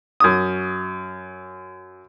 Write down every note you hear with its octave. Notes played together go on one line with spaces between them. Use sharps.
F#2 D#6